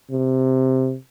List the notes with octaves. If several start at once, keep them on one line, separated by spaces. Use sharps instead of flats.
C3